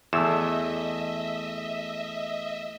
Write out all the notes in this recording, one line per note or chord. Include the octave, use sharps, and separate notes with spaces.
E2 A3 D#5 E5 E6 E7